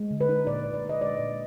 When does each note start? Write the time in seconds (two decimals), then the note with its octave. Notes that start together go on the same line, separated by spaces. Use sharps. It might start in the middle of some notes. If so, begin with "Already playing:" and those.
Already playing: G#3
0.11 D3
0.21 B4
0.29 D#4
0.47 A#2 D5
0.65 A#2
0.74 D5
0.84 D#4
0.89 D#5
1.01 G#3 D5
1.19 A#2